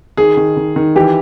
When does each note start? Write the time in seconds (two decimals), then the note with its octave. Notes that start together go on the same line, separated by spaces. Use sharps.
0.17 D#3 G#4
0.37 D#3
0.57 D#3
0.76 D#3
0.96 E3 G4